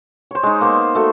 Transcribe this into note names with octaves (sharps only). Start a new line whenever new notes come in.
C5 C#5
G#3 D#4
A#3 B3 C5
A3 F#4